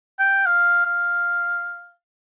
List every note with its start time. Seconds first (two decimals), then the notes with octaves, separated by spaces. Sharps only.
0.19 G5
0.46 F5
0.85 F5